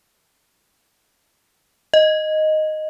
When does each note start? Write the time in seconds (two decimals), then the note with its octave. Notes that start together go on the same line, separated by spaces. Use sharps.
1.94 D#5